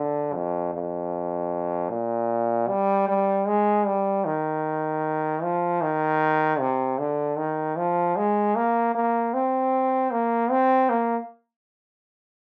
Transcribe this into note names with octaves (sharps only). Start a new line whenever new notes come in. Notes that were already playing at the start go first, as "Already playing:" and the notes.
Already playing: D3
F2
F2
A#2
G3
G3
G#3
G3
D#3
F3
D#3
C3
D3
D#3
F3
G#3
A#3
A#3
C4
A#3
C4
A#3